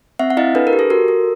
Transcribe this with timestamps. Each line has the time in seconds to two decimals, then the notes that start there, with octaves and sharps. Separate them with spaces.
0.19 C4 E5 F#5
0.30 F#5
0.37 E4 D#5 F5
0.55 D4 A4 B4
0.67 A#4
0.73 G4
0.79 A4
0.90 F#4 A#4
1.08 A4